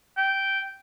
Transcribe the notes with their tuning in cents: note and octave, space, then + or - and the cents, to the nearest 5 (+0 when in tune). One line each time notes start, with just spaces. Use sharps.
G5 -10